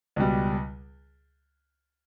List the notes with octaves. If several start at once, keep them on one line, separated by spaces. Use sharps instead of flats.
C#2 B2 G3